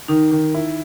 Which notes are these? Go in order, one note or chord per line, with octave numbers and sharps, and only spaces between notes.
D#3 D#4
D#3
E4